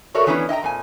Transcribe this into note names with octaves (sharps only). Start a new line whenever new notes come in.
F#4 A4 A#4 C#5 D5 E5
D#3 E3 B3 C#4 D4 E4
D#5 E5 G5 A#5
F2 A#2 G#5